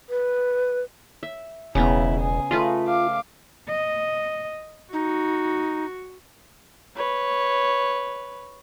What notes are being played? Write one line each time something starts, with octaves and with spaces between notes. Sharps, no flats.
B4
E5
E1 C#3 B3 E4 A#5
G#4
A3 F4 B4 D#5
F5 D6
D#5
D#4 F#4
B4 C#5